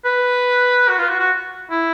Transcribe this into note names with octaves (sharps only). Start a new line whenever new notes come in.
B4
F#4
F4
F#4
F#4
E4